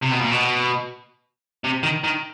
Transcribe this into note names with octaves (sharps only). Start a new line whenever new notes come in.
C3
B2
A#2
B2
C3
D#3
D#3